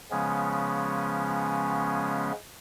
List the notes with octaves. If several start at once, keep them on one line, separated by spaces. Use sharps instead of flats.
C#3 F3 G#3 B3 C#4